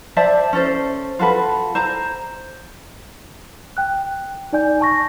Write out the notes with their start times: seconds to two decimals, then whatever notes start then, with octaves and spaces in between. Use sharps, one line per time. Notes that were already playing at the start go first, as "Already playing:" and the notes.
0.17 C5 D5 E5 A5
0.53 C#4 A4 C5
1.19 F4 F#4 A4 B4
1.75 C5 A#5
3.77 G5 F#6
4.53 D#4 D5 G#5 G6
4.81 A5 C#6 A#6